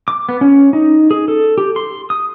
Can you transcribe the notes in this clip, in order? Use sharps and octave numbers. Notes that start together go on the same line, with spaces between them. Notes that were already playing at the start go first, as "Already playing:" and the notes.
D6
B3
C#4
D#4
G#4
A4
G4
C6
D#6